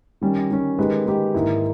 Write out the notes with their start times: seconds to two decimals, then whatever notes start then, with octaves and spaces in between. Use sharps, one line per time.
0.21 D#3 G3 C#4
0.50 D#3 G3 C#4
0.78 D#3 G#3 D#4 G4 B4
1.06 D#3 G#3 D#4 G4 B4
1.34 G#2 D#3 A#3 E4